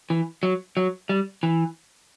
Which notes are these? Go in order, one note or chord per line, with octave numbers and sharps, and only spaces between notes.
E3
F#3
F#3
G3
E3